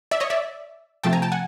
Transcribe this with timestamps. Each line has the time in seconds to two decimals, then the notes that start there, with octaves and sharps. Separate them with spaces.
0.11 D5 E5
0.20 C#5 D#5
0.30 D5 E5
1.03 C3 F3 A3 G5 A5
1.13 G#5 A#5
1.22 G5 A5
1.32 F#5 G#5